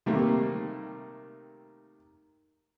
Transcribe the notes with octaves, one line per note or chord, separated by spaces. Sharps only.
C3 D#3 G3 A3 A#3